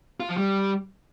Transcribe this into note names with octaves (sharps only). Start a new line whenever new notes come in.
F4
F3
G3